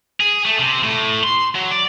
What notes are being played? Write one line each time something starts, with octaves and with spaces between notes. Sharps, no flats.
G#4
A3
C3
A2
C6
F#3
D5